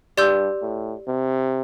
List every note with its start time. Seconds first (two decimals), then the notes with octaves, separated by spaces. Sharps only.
0.17 G2 G4 D5 C6 E6 G6
0.62 A2
1.08 C3